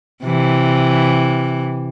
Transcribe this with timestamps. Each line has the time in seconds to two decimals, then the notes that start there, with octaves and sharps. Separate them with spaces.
0.24 C3 E3